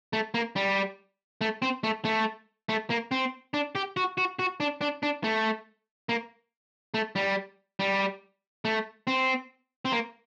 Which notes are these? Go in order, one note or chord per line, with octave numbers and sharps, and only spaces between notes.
A3
A#3
G3
A3
C4
A3
A3
A3
A#3
C4
D4
G4
F#4
F#4
F#4
D4
D4
D4
A3
A#3
A3
G3
G3
A3
C4
C4
A#3